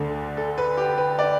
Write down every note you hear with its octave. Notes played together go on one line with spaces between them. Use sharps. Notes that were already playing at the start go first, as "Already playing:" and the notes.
Already playing: D2 D3 A3 A4
A4
B4
G4
B4
D5